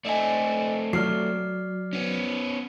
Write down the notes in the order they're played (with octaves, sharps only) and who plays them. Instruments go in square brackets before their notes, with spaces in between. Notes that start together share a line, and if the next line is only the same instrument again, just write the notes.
[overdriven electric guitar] A3 C4 [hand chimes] D5 D#5 G#5
[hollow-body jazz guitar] F#3 [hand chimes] D5 F6 C7
[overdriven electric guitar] B3 C#4